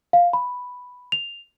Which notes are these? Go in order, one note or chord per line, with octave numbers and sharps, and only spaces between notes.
F5
B5
F7